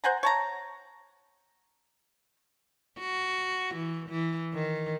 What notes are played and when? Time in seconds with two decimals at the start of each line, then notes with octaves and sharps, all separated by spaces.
0.04 C5 F#5 G#5 A#5
0.23 C#5 A5 A#5
3.00 F#4
3.74 E3
4.09 E3
4.54 D#3